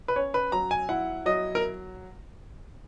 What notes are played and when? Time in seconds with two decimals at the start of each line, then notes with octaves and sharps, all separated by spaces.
0.08 B4
0.16 C#4 C#5
0.34 B4
0.52 F#3 A#5
0.71 G#5
0.89 E4 F#5
1.26 F#3 D#5
1.55 A#4